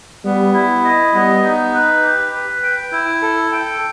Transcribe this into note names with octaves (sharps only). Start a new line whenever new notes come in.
G3 B3
E4
D#5
G3 B3
D#4
B4
G4
B4
G5
E4
A4
G5